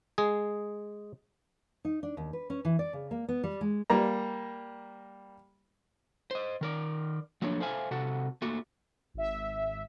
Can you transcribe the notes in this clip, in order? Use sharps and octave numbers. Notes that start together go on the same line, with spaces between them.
G#3 G#4
D#4
D4
D#2
B4
C#4
E3
D5
C#3
A#3
B3
G3
G#3
G3 A#3 A#5
C5 D#5
D#3 A#4 D5
F3 F#3 A3 A#3 D4 C#5
A4 C5 D5 E5 F5 G#5
C3 F#4 A4 F#5
A3 A#3 F#4
G#1 E5